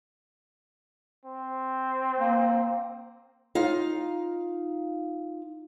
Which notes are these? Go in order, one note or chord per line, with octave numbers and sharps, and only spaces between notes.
C4
A#3
D#4 F4 F5